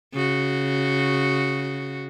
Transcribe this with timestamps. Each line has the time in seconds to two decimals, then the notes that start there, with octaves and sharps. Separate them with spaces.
0.13 C#3 F#4